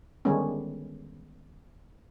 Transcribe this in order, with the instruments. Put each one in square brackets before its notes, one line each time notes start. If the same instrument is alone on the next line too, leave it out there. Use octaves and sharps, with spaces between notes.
[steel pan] D3 D#3 G3 G#3 B3 C#4